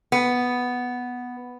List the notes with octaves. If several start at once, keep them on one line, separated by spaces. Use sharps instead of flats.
B3